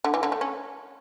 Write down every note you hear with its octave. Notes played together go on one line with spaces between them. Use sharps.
D3
E3
D3
A3
C#4